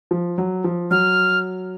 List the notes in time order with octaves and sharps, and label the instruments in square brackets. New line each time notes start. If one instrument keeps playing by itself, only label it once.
[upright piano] F3
F#3
F3
[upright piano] F#3 [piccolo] F6